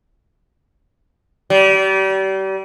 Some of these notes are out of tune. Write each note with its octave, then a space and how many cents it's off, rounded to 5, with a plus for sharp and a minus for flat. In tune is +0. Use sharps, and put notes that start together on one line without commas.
G3 -35